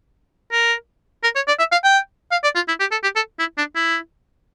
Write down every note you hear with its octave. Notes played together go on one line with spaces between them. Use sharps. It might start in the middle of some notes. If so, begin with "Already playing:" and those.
A#4
A#4
C#5
D5
E5
F5
G5
F5
D5
F4
E4
G4
A4
G4
A4
E4
D4
E4